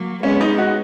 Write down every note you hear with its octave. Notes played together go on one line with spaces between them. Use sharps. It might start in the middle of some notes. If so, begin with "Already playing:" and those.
Already playing: F#3 A#3
G#3 B3 C#4
D#4
F#4